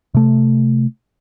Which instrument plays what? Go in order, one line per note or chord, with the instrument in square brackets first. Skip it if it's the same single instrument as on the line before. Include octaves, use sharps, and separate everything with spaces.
[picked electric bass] C3 A3